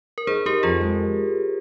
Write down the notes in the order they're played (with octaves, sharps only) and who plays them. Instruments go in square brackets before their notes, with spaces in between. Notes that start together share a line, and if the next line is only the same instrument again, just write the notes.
[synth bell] A#4
[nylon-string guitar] D#4 [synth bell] G#4 C5
[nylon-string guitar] D#4 [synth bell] G4 A#4
[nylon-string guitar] F2 [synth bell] F4 G#4
[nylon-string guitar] G#3